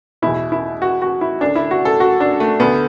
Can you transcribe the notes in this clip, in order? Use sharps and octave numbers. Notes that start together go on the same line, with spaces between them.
E2 B2 E4
E4
F#4
F#4
E4
D2 D3 D4
E4
F#4
A4
F#4
D4
A3
D2 D3 B3